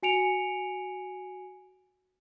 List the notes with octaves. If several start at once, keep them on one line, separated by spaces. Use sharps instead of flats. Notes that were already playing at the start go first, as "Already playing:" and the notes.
F#4 G#5 C#7 D7 F7